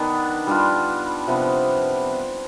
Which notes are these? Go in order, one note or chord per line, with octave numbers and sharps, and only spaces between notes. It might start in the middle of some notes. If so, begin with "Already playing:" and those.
Already playing: D#3 B3 D4
G3 D4 F4
C3 F3 B3